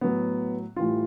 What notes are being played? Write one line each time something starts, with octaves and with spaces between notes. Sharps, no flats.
A2 F#3 B3
A2 E3 G3 F4